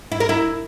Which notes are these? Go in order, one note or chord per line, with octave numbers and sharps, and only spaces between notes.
E4
A#4
E4